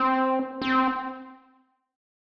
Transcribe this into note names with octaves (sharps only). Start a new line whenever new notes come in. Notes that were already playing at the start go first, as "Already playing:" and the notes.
Already playing: C4
C4